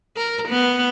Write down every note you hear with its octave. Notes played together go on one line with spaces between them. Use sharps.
A#4
B3